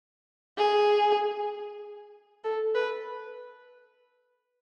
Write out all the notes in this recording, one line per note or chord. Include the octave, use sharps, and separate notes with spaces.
G#4
A4
B4